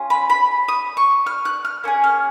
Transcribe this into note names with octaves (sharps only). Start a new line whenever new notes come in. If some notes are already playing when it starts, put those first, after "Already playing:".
Already playing: C#4 F4 G#4
B5
B5
D#6
C#6
F6
F#6
F6
A#3 C#4 G#4
F6